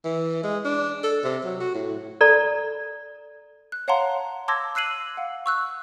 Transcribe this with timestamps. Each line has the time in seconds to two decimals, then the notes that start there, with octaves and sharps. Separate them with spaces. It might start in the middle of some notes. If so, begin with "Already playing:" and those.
0.05 E3
0.44 G#3
0.65 D4
1.04 A4
1.24 C3
1.45 F#3
1.60 F#4
1.75 A2
2.21 A4 D5 A#5
3.72 F#6
3.88 C#5 F5 F#5 A5 A#5 C6
4.48 A5 C6 D6 E6 G#6 A#6
4.75 E6 F#6 C7 D#7 F#7
5.17 F5 F#5
5.46 C#6 E6 F#6